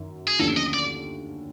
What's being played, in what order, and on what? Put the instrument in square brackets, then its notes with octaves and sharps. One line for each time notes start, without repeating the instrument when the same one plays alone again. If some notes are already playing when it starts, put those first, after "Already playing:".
Already playing: [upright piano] F#2 D#3
[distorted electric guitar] G#4
[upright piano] D#2 D3 F3 A3 C#4 [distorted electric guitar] A4
[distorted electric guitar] D#5
D5